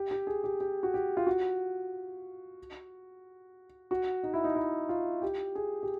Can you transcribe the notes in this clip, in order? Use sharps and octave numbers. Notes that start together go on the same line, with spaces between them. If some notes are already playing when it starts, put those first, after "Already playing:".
Already playing: G4
G4
G#4
G4
G4
F#4
G4
F4
F#4
F#4
D#4
E4
D#4
E4
F4
G4
G#4
G4